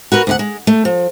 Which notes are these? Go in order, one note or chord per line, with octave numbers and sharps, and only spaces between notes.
F#4 A#4 B4
D2 E4 F#5
G#3
A3
F3